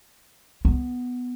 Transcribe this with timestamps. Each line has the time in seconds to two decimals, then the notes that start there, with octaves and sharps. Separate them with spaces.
0.65 B3